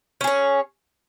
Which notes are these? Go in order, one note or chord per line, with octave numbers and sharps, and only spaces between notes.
C#4 G#4 C#5